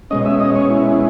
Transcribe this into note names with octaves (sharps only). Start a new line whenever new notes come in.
B2 G#3 C#4 D#5
E5
D#5
C#5
E4